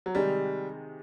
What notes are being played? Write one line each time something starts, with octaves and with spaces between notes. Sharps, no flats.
F#3
C3 D#3 G3 G#3